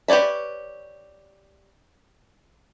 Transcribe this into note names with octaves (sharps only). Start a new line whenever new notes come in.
G4 B4 C#5 D5 E5